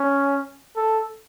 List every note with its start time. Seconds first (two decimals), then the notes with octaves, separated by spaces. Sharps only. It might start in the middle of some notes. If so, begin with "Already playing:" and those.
Already playing: C#4
0.77 A4